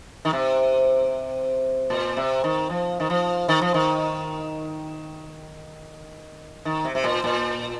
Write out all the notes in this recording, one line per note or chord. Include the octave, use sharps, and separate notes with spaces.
D#3
C3
A#2
C3
D#3
F3
D#3
F3
D#3
F3
D#3
D#3
C3
C3
A#2
A#2